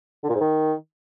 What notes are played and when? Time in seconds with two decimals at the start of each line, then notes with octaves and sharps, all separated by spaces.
0.24 D3
0.29 A#2
0.35 G#2
0.41 D#3